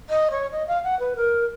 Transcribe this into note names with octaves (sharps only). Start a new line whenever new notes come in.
D#5
C#5
D#5
F5
F#5
B4
A#4